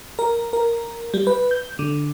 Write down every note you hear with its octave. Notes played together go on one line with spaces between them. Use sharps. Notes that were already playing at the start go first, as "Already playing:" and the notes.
A#4
A#4
G3
B4
G6
D3